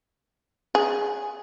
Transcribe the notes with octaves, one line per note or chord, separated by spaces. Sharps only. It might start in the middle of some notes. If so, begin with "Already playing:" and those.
G#4